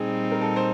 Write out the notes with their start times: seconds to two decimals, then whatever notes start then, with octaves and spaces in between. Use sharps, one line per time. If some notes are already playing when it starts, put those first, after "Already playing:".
Already playing: A#2 G3 C4 D#4 G#4
0.32 A#4
0.41 A4
0.56 C5